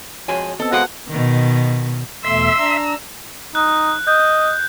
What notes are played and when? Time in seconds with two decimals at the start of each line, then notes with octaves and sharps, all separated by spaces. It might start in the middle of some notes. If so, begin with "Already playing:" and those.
0.28 F2 G#3 F#4 C#5 G#5
0.60 B3 C4 A4 D#5 E6
0.73 B2 G#3 F#4 A4 C5 D#5 F5 F#5
1.08 B2 D#3
2.25 E2 B2 A3 E5 C6 E6
2.58 D4 A#5
3.55 D#4 F#6
4.07 D#5 G6